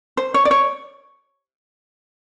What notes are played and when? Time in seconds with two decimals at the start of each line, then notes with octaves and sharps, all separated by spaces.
0.17 C5
0.34 C#5
0.45 D5
0.51 C#5